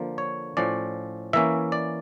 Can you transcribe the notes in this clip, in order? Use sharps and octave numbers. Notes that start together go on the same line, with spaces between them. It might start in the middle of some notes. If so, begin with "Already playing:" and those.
Already playing: D3 F3 A#3
C#5
A2 F3 C#4 D5
E3 A#3 C#4 E5
D5